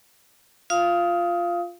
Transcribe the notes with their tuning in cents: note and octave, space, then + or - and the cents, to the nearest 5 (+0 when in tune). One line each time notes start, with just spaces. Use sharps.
F4 +0 F5 -15 D#6 +20